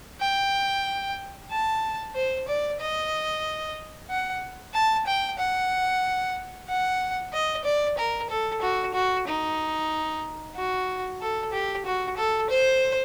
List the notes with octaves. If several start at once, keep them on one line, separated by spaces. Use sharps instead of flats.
G5
A5
C5
D5
D#5
F#5
A5
G5
F#5
F#5
D#5
D5
A#4
A4
F#4
F#4
D#4
F#4
A4
G4
F#4
A4
C5